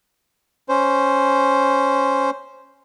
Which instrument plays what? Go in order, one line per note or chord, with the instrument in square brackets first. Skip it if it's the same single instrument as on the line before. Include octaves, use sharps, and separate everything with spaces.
[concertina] C#4 C5